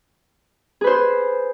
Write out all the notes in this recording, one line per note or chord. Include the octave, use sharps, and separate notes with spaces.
G#4 B4 C5